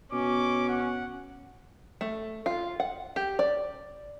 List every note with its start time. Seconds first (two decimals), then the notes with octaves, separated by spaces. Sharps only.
0.13 B2 C#4 D6
0.69 F#5
2.01 A3
2.46 F4
2.80 F#5
3.16 G4
3.39 D5